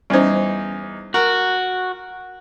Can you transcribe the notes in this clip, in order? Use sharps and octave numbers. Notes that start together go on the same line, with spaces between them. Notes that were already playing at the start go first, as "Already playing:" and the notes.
E2 G3 C#4 D#4 C5
F#4 A#4